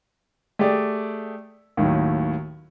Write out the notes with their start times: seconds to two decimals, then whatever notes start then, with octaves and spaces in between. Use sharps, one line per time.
0.59 A3 G4 G#4 D5
1.77 D#2 A2 D#3 F#3